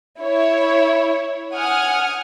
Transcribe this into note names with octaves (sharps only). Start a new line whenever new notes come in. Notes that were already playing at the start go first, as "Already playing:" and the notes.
E4 C#5
F#5 G#5 D#6 F6